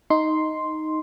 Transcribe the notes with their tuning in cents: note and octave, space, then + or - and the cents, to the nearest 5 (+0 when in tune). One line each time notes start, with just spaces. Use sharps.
D#4 +5 C6 +0